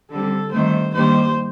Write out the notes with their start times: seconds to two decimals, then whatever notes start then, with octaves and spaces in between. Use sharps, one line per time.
0.10 D3 G3 C4 A4
0.52 G2 D#3 A3 C4 C5
0.94 G2 D#3 G3 A#3 D4 C5